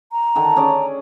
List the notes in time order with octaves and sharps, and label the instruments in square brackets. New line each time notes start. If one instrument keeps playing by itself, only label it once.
[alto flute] A#5
[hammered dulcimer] D3 D#3
C#4 G#4 D5